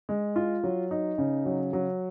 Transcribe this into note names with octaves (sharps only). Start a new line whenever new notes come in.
G#3
F4
F#3
D#4
C#3
F#3
F#3